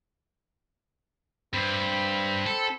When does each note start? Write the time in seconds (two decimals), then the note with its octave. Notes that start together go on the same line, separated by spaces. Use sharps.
1.53 G2 C4 B5
2.47 A4